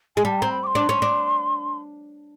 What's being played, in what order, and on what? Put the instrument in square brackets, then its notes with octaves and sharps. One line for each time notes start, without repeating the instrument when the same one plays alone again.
[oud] G#3 [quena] G#5
[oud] G3 [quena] A5
[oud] C4 [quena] A#5
[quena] B5
D6
C6
[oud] D4
C#4
D4